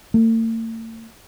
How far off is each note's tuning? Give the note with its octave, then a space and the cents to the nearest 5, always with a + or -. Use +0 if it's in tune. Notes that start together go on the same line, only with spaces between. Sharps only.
A3 +45